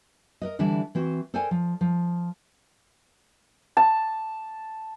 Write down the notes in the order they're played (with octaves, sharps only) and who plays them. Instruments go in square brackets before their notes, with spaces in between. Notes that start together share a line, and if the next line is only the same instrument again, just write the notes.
[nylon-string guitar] A#4 B4 D#5
D3 E3 G3 D4 E4
E3 C4 F#4
A4 A#4 C5 D5 G5 G#5
F3
F3
[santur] A5